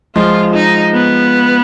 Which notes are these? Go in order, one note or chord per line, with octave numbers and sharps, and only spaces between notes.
F3 G#3 F4
D#4
B3